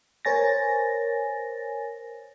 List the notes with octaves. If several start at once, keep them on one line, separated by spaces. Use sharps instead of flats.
A#4 C5 C#5 G#5 A6 A#6